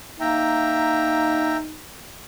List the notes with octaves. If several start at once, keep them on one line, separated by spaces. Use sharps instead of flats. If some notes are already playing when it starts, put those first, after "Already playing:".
A#3 D#4 E5 G5 A#5